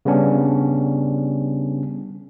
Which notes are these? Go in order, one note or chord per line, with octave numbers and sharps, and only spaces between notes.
C#3 G3 B3 C#4 D4